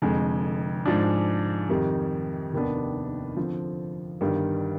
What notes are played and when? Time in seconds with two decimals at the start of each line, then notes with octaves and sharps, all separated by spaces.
0.02 F1 F2 D3 G#3
0.86 G#2 F3 G#3 D4
1.69 F2 C3 D#3 G3
2.53 F1 D#2 D#3 B3 D4
3.37 D3 F3 C4
4.21 G1 G2 D#3 G3